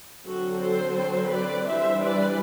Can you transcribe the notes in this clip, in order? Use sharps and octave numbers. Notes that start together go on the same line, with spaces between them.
D3 F#3 C4 F#4 A4
A4 C5
A4 C5
B4 D5
E3 G3 D4 C5 E5
B4 D5